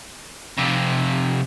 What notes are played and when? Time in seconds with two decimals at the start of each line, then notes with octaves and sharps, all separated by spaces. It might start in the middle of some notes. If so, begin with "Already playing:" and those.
0.58 F2 C3